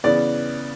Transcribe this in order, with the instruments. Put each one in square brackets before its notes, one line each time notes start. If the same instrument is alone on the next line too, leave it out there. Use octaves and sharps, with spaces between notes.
[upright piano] C#3 E3 B3 D5